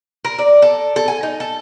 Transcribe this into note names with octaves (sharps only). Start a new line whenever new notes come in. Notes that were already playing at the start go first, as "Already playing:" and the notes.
A#4
D5
A4
A4
G#5
D#4
A4